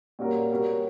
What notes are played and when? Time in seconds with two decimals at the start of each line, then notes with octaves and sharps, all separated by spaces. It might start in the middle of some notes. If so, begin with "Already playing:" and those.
0.19 A#2 G3 C#4 F#4 A#4
0.50 G3 B3 F#4 A#4 C#5